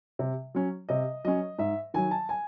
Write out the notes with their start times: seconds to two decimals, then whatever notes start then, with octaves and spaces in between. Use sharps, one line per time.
0.19 C3
0.55 F#3 C#4
0.89 C3 D#5
1.25 F#3 C#4 D#5
1.58 G#2 E5
1.94 D#3 F#3 G#5
2.11 A5
2.29 G#5